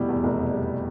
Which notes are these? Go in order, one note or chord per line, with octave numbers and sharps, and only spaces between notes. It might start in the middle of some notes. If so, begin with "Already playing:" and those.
Already playing: F1 B2 G3 E4 G4
E2
F1
B2
G3